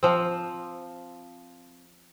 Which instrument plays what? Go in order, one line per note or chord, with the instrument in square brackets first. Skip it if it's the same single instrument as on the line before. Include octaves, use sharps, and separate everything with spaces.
[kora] F3 C4